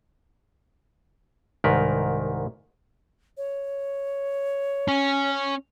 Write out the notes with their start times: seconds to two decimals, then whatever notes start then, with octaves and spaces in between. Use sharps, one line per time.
1.64 C2 G#2 D#3 A#4 B4
3.37 C#5
4.88 C#4